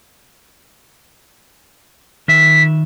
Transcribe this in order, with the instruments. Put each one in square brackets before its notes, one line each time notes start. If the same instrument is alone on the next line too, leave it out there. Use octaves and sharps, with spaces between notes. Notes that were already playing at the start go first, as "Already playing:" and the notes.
[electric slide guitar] D#3 E5 [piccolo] B6